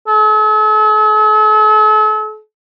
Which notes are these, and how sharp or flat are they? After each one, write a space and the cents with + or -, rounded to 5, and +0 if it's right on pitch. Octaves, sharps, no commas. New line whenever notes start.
A4 -45